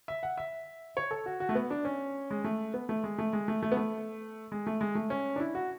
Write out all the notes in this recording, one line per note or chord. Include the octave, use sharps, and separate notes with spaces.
E5
F#5
E5
C#5
A4
F#4
F#4
A3
B3
D4
C#4
G#3
A3
B3
A3
G#3
A3
G#3
A3
A3
B3
A3
G#3
A3
G#3
A3
C#4
D4
E4
F#4